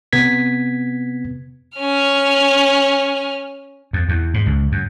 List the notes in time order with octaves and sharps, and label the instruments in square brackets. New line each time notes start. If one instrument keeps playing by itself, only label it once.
[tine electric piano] C3 B3 G#6 B6
[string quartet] C#4 F6
[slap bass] F2
E2
G#2
C#2
F#2